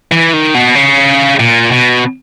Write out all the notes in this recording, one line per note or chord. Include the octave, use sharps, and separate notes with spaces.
E3
D#3
B2
C#3
A#2
B2